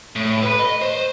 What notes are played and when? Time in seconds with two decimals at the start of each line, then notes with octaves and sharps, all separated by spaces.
0.16 A2
0.43 B4 B5
0.59 D#5
0.82 C5